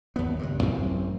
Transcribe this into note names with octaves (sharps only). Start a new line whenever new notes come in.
D#2 B3
C#2 G2
A1 F#2 C4